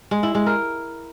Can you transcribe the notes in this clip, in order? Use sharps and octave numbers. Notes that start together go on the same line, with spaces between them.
G#3
E4
G#3
A#4